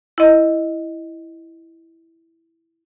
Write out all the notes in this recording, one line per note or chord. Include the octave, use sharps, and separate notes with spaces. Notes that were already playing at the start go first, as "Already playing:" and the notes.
E4 D#5